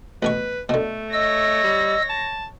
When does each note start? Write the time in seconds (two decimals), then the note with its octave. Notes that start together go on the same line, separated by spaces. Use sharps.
0.23 A1 B2 B4 C#6
0.69 B2 D3 A3
1.13 C#5 D#5 E6 A#6
1.64 G3
2.10 A5